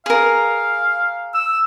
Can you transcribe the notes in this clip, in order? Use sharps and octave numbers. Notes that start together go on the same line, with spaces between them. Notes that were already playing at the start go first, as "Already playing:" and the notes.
G#4 A#4 F5
E6